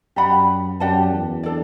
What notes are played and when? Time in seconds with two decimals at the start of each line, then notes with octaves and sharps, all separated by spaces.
0.16 F#2 G4 D5 F#5 B5
0.80 F#2 G4 D5 F#5 A5
1.12 E2
1.43 D4 A4 D5